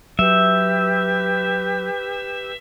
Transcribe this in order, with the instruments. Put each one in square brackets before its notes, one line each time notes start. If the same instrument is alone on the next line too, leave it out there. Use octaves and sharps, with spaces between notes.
[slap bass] F#3 [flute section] G4 B4 [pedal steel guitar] E5